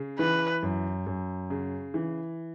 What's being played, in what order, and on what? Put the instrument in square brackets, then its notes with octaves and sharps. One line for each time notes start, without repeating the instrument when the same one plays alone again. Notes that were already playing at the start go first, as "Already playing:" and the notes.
Already playing: [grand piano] C#3
[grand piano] E3 [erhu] B4
[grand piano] F#2
F#2
C#3
E3